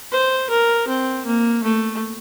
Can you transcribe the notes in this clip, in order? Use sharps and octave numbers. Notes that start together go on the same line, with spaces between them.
C5
A#4
C4
A#3
A3